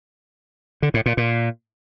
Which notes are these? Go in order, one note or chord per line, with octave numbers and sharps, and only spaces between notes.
D3
A2
A#2
A#2